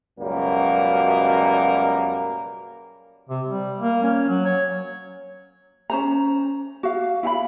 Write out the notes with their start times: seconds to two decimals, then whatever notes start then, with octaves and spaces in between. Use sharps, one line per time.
0.19 C#2 F#2 B2 G3 A#3
3.29 C3
3.48 G3
3.80 A#3
4.03 C#4
4.28 F#3
4.45 C#5
5.90 C#4 C5 A#5
6.83 F#4 F5
7.23 E4 F5 G5 B5